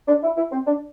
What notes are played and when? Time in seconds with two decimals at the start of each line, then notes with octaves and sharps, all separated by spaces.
0.08 D4
0.23 E4
0.37 E4
0.52 C4
0.67 D4